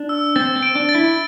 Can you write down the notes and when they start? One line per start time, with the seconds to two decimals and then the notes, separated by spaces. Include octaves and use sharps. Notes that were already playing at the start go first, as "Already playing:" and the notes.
Already playing: D4
0.09 E6
0.36 C4 A6
0.56 C4
0.63 D7
0.75 D4
0.89 A6
0.95 E4